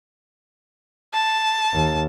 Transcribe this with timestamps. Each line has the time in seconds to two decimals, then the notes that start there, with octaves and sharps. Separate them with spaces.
1.14 A5
1.73 D#2